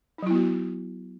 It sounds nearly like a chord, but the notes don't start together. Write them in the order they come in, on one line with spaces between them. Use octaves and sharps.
D#4 F#3 E4 B3 F#4